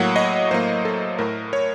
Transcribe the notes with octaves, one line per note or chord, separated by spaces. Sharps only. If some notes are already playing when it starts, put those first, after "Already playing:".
Already playing: A2 F#3 A#3 F#5
D#5
A2 F#3 A#3 C5
A4
A2 A3 A#4
C#5